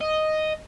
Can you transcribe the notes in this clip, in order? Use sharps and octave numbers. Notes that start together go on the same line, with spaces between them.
D#5